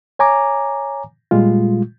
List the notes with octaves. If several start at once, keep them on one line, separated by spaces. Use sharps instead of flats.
C#5 G#5 A#5 D6
A#2 G3 G#3 F4